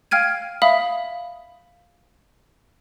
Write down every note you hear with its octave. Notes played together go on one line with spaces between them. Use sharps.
F5 G5 F6 G#6 D#7
E5 F5 B5 D#6